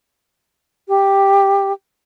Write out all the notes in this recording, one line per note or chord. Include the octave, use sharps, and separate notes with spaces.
G4